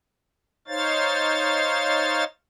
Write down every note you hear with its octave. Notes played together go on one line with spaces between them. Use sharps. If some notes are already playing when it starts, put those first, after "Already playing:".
D#4 C5 C#5 F5 A6